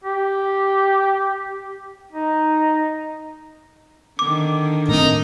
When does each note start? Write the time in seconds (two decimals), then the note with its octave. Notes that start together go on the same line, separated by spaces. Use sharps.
0.04 G4
2.13 D#4
4.19 D3 D#3 D6
4.88 A2 A3 C4 D#4 A#4